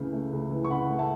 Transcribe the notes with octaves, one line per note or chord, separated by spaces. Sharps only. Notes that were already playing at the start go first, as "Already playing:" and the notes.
Already playing: C#2 C#3 E3 A3
A3
C#2
E3
C#6
C#3 F#5 B5
A3
E5 A5